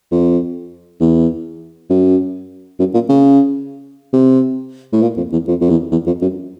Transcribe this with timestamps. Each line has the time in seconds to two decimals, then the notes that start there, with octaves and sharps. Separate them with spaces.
0.11 F2
1.00 E2
1.90 F#2
2.79 F#2
2.94 A#2
3.09 C#3
4.13 C3
4.93 A2
5.02 A#2
5.17 F2
5.32 E2
5.48 F2
5.61 F2
5.70 E2
5.92 E2
6.06 F2
6.22 F#2